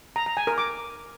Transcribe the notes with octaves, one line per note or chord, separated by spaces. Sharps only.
A#5
A#5
G#5
A#4
D6